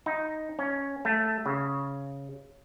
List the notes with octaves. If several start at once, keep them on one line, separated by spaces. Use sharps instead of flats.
D#4
C#4
A3
C#3